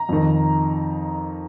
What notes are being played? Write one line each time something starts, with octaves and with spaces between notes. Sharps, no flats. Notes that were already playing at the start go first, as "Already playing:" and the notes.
Already playing: A#5
F2 D#3